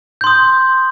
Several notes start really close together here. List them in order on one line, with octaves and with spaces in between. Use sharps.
G6 C6 D#6